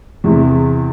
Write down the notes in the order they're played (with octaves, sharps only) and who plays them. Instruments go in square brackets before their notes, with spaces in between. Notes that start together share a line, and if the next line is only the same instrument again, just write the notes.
[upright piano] E2 C3 E3